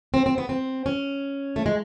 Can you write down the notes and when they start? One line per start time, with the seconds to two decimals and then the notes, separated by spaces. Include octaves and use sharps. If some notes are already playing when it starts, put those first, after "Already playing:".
0.14 C4
0.26 C4
0.38 B3
0.49 C4
0.86 C#4
1.56 A3
1.66 G#3